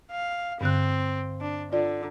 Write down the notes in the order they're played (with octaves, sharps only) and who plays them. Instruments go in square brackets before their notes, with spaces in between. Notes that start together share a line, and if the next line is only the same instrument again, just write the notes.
[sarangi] F5
[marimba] G2 D3 F#6 [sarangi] C4
[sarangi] D4
[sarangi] D3 [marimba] F4 D5